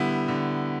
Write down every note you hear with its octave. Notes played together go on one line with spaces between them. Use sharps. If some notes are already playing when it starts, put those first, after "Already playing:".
Already playing: D3 G3 B3 E4
D3